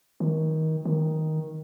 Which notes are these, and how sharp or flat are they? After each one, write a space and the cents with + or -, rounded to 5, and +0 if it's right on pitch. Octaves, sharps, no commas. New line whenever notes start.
D#3 +25
D#3 +10